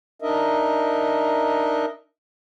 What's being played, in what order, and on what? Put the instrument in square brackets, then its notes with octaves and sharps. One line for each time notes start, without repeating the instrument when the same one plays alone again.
[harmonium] D4 D#4 A#4 D#5 E5